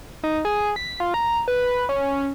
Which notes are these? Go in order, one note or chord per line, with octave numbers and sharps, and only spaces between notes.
D#4
G#4
B6
F4
A#5
B4
C#4